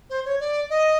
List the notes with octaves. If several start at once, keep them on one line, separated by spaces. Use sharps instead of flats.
C5
C#5
D5
D#5